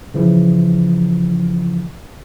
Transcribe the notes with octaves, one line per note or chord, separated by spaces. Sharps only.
C#3 E3 F3